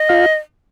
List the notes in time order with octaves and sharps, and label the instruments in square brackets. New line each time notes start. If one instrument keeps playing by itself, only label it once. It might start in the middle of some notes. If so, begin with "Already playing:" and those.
Already playing: [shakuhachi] D#5
[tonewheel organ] F4 F5